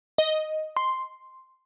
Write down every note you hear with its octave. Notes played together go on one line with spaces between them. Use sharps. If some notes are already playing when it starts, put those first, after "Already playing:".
D#5
C6